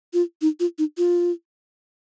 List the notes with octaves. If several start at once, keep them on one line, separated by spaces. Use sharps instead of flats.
F4
D#4
F4
D#4
F4